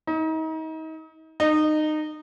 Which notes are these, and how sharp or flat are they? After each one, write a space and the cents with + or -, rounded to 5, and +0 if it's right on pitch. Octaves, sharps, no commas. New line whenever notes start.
D#4 +35
D#4 -20